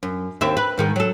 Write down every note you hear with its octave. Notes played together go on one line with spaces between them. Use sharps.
F#2
D#2 C4 E5
B4
G#2 D#3 G#3
F#3 A4